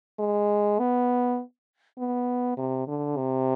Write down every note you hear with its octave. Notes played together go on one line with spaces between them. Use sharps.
G#3
B3
B3
C3
D3
C3